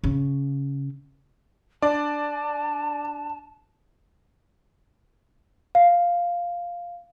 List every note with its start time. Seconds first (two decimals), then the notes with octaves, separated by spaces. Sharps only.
0.04 C#3
1.82 D4 D5 A5
5.75 F5